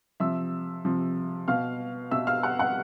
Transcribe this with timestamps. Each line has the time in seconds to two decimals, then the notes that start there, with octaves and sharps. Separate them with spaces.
0.20 C3 F3 E5 E6
0.85 C3 F3
1.48 B2 F5 F6
2.11 B2 E5 E6
2.27 F5 F6
2.43 F#5 F#6
2.59 F#5 F#6